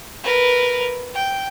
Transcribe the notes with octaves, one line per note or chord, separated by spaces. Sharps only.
A#4 B4
G5